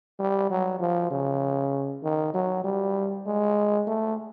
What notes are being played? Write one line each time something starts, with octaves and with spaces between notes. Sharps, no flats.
G3
F#3
F3
C#3
D#3
F#3
G3
G#3
A3